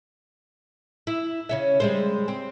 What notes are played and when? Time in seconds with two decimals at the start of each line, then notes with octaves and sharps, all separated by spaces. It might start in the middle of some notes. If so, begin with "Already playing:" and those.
1.07 E4
1.49 C#3 C#4 E5
1.80 G3 G#3 C5
2.28 C4